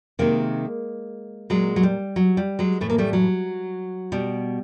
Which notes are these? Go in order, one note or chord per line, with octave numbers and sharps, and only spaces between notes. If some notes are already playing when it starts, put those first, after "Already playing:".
C3 D#3 G#3 A#3
A#2 F#3 G#3
F#3
G3
F#3
G3
F#3 G#3
A2 E3 A3
A#3
G3 A3
F#3
B2 G3